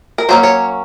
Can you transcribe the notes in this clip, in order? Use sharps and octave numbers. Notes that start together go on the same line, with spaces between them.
A#4
F#3 A#3 C#4 C5
C#5